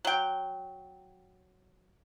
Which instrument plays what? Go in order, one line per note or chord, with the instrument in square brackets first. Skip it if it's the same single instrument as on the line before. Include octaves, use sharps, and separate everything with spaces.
[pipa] F#3 G5